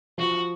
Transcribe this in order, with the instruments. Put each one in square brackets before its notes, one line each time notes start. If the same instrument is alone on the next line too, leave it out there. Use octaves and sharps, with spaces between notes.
[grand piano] F3 [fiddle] F#4